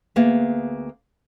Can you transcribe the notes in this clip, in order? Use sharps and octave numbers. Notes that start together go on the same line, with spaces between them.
D2 A#3 B3 G#4 E5